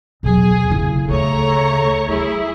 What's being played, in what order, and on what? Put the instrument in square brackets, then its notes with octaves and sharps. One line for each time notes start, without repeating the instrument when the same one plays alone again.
[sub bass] E2 [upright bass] B2 F#3 [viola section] G#4
[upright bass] F1 E4 [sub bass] C#3
[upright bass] D2 [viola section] A3 C#5 A#5
[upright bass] G3 [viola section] E4 G#4